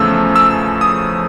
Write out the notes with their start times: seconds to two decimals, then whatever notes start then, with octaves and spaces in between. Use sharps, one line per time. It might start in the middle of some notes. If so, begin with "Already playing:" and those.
Already playing: E2 C#3 F3 A3 E6
0.36 E6
0.81 D#6